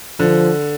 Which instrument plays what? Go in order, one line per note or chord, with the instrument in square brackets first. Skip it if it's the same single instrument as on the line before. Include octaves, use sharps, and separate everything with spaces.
[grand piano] D3 [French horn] F3